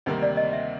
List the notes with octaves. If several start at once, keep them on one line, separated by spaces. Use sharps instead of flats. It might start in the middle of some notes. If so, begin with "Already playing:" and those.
D2 C3 D#3 G3 A#3 C5
D5
D#5
E5